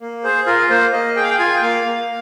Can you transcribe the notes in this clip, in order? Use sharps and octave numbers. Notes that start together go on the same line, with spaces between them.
A#3
G#4 C5
F4 A#4
A#3 C5
A#3 D#5
G#4 G5
F5
G5
F4 G#5
G5
A#3 F5
A#3